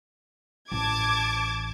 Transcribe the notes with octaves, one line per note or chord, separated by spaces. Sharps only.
A1 A5 D6 G#6